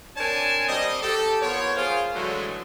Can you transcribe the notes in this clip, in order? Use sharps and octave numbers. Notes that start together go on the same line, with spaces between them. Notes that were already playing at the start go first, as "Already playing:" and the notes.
C4 D4 A#4 C#5 G#5 A5
G3 C4 D#5
G4 A4
F3 B3 A#4 C#5
F4 G#4 A#4 C5 F5
A2 D3 E3 F#3 G#3 A3